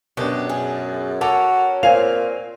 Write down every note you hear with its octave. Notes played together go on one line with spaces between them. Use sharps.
F#2 B2 D4 G4
G#4
C#4 F#4 A4 A#4 C#5 D6
A#2 C4 F5 G#5 F7